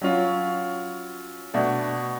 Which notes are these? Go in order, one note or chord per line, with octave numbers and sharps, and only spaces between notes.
F#3 C#4 F4
B2 A3 D4